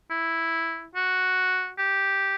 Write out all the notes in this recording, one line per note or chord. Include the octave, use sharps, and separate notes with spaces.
E4
F#4
G4